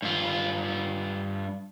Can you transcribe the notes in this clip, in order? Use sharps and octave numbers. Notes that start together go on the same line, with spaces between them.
G2 F4